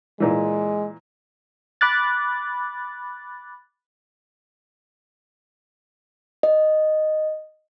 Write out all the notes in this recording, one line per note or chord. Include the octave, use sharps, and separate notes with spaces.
A#2 E3 G#3
B5 D6 F#6 A6
D#5